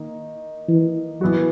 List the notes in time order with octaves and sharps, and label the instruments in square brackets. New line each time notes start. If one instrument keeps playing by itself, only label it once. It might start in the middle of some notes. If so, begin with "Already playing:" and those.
Already playing: [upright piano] D#3 A#3 D#4
[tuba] E3
[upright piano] E3 B3 F#4 [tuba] F#3